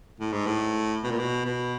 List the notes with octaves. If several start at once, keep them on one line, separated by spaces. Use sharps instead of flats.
A2
G#2
A2
B2
A#2
B2
B2